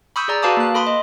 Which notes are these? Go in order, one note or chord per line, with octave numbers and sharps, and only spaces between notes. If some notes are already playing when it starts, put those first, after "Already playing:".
B5 C#6 D#6 E6 G6
G#4 D5 A#5
F#4 B4 F5 A5 D6 D#6
A#3 F#6
A4 B5 C6 D#6
D#5